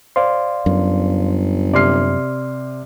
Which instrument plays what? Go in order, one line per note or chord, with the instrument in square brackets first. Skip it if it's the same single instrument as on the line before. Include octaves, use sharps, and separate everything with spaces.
[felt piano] C5 [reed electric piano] D5 F5 C6
[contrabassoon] G1 [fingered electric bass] F#2
[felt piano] C3 C7 [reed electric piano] D5 C6 F6